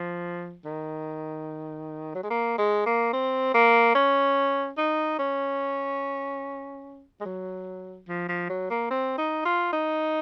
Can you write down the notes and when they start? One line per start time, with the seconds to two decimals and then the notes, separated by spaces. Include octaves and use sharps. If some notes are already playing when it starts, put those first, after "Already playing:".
Already playing: F3
0.65 D#3
2.15 F#3
2.23 G#3
2.30 A#3
2.58 G#3
2.86 A#3
3.13 C4
3.54 A#3
3.95 C#4
4.78 D#4
5.19 C#4
7.21 G#3
7.25 F#3
8.08 F3
8.29 F3
8.49 F#3
8.70 A#3
8.91 C4
9.18 D#4
9.45 F4
9.73 D#4